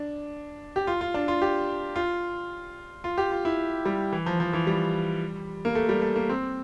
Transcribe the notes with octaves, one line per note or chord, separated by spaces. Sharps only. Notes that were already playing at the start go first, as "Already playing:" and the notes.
Already playing: D4
G4
F4
F4
D4
F4
G4
F4
F4
G4
F4
E4
G3
E3
F3
F3
E3
G3
A#3
A3
G3
A3
A#3
C4